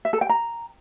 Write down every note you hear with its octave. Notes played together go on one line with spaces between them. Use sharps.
E5
A4
G5
A#5